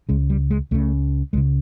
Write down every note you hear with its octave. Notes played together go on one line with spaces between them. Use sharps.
C#2 C#3 G#3
G3
G#3
C#2 C#3 A3
C#2 C#3 G#3